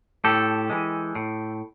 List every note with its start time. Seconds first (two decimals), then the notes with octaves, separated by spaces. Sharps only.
0.24 A2 G4 A4
0.70 E3 G#3
1.15 A2